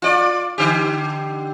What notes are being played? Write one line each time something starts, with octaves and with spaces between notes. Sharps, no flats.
F4 D5
D3 G4